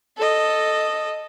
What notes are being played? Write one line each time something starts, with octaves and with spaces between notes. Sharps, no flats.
A4 D#5